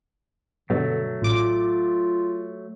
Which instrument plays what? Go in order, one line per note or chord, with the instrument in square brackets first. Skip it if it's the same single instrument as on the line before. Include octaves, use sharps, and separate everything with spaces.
[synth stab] G2 B2 [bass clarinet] D3 [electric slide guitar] F#3 A3
[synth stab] A1 D6 [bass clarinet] F4